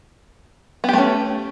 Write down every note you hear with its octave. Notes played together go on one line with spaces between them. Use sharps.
A3 B3 C#4 G4